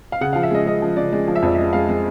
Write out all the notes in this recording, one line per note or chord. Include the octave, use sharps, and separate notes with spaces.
F5
C#3 F#5
F3 F5
E5
G#3 D#5
G#3 D#5
F3
C#3 D5
G#3 D5
F3
E5
F2 D5
E5
G#3 D#5
G#3 F5
G#3